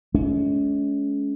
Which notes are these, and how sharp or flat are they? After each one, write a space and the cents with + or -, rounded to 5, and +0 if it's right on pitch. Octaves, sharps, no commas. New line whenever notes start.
G#3 +40 C#4 +30